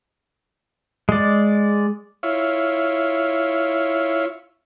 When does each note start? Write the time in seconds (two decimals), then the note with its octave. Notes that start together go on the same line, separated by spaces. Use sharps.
1.09 G#3 D5
2.23 E4 F4 C#5